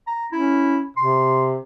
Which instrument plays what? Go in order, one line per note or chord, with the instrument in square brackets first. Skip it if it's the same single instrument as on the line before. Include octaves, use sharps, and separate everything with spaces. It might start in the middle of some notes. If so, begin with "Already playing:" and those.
[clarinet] A#5
[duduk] C#4 [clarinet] E4
[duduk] C3 [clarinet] C6